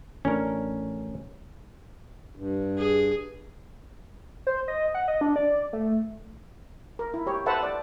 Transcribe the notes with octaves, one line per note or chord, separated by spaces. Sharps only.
A1 A3 C#4 D4 A#4
G2
G#4
C5
D#5
F#5
D#5
D4
D5
A3
A#4
E4
G4 C#5
A4 B4 C5 E5 F#5 A5
D5